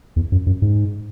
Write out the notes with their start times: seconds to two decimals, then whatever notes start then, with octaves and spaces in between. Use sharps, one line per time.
0.16 E2
0.32 F#2
0.47 F#2
0.62 G#2